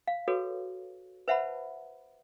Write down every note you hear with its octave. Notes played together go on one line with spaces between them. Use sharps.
F5
F#4 G#4 A4 B4 C#5
B4 C5 E5 F#5 A5 B5